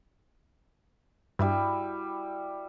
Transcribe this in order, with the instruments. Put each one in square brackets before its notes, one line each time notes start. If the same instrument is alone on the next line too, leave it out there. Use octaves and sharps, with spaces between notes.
[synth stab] G2 [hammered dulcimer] G3 E4 F#4